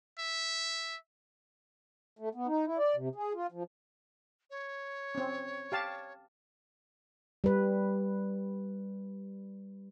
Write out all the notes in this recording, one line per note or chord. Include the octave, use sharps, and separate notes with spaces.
E5
A3
B3
D#4
E4
D5
C3
G#4
F4
F3
C#5
C4 C#4
G4 F5 A5
G3 B4